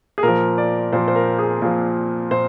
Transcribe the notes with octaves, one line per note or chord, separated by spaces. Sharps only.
G#4
A#2 F3 A#4
D5
A#2 F3 C5
C5
A#4
G#4
A#2 F3
A#2 C5